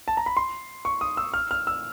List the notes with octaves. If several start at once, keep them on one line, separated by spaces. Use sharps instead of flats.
A5
A#5
B5
C6
C#6
D#6
E6
F6
F6
E6